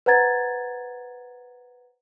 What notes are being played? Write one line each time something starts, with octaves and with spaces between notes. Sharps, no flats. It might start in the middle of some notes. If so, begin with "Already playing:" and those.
B4 C5 F#5 A#5 G#6 A6